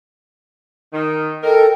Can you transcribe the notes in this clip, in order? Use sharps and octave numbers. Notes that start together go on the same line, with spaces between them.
D#3
A4 A#4 D#5 G5